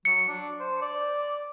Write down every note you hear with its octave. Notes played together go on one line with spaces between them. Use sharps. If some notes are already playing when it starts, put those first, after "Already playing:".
F#3 C#7
D4
C5
D5